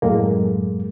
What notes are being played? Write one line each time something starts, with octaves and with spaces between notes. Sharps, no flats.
F#2 A2 F#3 G#3 A#3